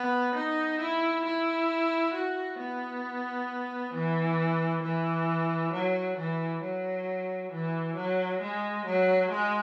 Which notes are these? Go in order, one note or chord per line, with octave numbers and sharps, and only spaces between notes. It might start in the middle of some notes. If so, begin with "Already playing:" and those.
Already playing: B3
D#4
E4
E4
F#4
B3
E3
E3
F#3
E3
F#3
E3
F#3
G#3
F#3
G#3